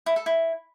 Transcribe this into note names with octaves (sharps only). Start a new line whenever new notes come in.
E4
A4
E4